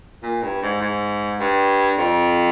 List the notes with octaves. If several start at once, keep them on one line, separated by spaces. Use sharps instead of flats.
A#2
G2
G#2
G#2
G2
F2